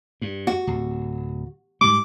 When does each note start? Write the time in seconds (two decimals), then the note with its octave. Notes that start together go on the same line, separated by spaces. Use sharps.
0.21 G2
0.47 F#4
0.67 D1
1.81 G#2 G3 D6